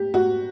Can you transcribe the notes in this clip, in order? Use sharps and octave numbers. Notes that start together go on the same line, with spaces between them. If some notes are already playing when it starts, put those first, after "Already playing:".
Already playing: G4
F#4